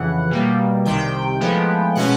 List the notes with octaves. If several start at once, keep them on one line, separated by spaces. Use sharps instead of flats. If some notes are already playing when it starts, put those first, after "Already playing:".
Already playing: F2 C#3 E3 F#5
B2 G3 A#3
C2 C3 D#3 G5
A2 F3 G#3 B3
B2 G#3 C#4 F#5